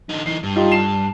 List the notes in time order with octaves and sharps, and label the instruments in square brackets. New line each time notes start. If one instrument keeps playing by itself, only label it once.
[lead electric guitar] D3 D#4
[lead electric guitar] E3 D#4 [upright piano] C7
[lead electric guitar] G2
[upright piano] D#4 F4 G4
A5 C7 E7